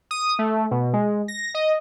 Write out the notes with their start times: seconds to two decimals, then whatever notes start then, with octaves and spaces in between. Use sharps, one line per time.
0.11 D#6
0.39 A3
0.71 B2
0.93 G#3
1.28 A#6
1.54 D#5